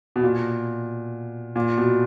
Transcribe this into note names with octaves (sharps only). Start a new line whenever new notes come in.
B2
A#2
A#2
B2